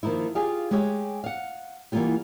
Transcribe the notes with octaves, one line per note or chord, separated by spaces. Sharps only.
D#3 F3 A#3 D#4 E4
F4 G4 G#4 D5 F5
G#3 G4 G#4 C#5 E5
F5 F#5
E3 G3 A#3 B3 F4 G4